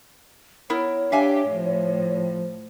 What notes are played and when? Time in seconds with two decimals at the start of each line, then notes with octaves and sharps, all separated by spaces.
0.70 B3 E4 A#4 C#5
1.12 D4 G4 E5 F5 G#5
1.49 A2 F3